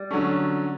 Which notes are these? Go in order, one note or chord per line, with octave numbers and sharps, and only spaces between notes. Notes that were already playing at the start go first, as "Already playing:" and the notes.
Already playing: G3
D3 F#3 A3 C#4